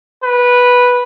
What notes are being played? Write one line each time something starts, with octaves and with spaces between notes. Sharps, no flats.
B4